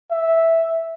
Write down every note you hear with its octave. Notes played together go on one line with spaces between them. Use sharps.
E5